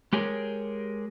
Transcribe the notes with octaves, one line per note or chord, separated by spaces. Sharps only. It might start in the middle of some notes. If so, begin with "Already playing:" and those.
G#3 G4 G#4 A#4 C#5